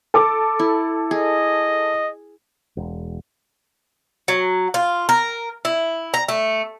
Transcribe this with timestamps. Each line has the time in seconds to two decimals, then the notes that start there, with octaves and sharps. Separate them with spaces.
0.14 A4 D6
0.59 E4
1.11 G#4 D#5
2.77 E1
4.28 F#3
4.74 F4
5.09 A#4
5.65 E4
6.14 A#5
6.29 A3